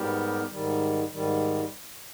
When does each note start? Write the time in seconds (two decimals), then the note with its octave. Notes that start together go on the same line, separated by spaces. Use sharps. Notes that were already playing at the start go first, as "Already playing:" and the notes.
Already playing: G#2 G3 B3 G4 A#4
0.51 G#2 D#3 G3
1.12 G#2 D#3 G3